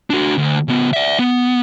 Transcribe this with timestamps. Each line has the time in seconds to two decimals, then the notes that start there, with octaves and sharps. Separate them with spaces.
0.10 D4 F#4
0.38 D2
0.68 C#3 B3
0.93 D5 E5
1.19 B3